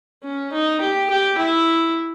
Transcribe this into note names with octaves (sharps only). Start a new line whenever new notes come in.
C#4
D#4
G4
G4
E4